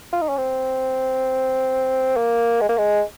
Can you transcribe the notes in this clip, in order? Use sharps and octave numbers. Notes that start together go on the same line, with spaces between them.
F4
D#4
C#4
C4
A#3
G#3
A#3
G#3